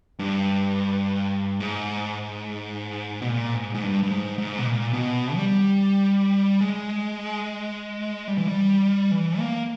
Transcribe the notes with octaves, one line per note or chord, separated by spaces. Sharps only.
G2
G#2
B2
A#2
G#2
G#2
G2
G2
G#2
G#2
B2
A#2
B2
G3
G#3
G3
E3
G3
E3
A#3